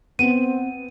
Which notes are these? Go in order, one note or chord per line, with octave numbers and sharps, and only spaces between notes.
B3 C4 D#7